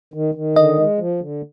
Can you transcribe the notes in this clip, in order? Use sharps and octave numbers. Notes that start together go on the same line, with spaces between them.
D#3
D#3
D3 D#5
G#3
F3
D3